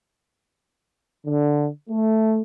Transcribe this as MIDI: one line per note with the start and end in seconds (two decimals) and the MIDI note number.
1.25 1.67 50
1.90 2.41 57